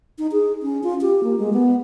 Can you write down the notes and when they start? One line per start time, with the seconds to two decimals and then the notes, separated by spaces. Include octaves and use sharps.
0.19 D#4
0.32 G#4
0.63 C#4
0.83 F4
1.01 G4
1.24 A#3
1.39 G#3
1.53 B3